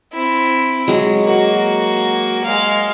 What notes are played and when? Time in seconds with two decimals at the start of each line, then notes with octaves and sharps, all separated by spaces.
0.13 C4 E4
0.88 F#3 G#3
1.24 A#3 F#4
2.44 G#3 F5